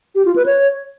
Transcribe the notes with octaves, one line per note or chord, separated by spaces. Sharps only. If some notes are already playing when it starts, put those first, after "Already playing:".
G4
F4
B4
C#5